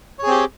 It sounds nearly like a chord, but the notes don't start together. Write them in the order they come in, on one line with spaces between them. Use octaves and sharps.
C#5 G#4 C4 G4